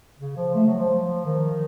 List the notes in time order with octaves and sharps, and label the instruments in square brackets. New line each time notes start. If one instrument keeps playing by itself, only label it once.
[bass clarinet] C#3
F3
A3
F#3
F3
D#3